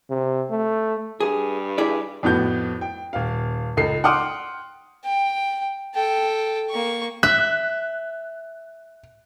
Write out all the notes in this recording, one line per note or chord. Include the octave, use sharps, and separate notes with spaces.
C3
A3
G2 G#4
E4 G#4 D5
F2 A2 B3 F#4 G6
G5
D#1 F5
C#2 D#4 A4 C7
F#5 G5 C6 D6 D#6 F6
G5
A4 G5
A#3 C#6
E5 F#6